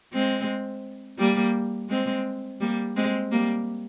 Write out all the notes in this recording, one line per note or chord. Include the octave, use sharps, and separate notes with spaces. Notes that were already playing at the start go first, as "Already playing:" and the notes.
G#3 C4
G3 A#3
G#3 C4
G3 A#3
G#3 C4
G3 A#3